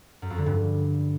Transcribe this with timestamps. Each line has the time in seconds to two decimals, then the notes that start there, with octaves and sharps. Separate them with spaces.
0.22 F#2
0.30 F2
0.38 D3
0.46 G2